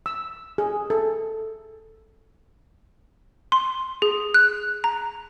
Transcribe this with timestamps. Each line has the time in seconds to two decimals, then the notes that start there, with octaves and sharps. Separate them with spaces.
0.06 E6
0.58 G#4
0.90 A4
3.52 C6
4.02 G#4
4.34 F#6
4.84 A#5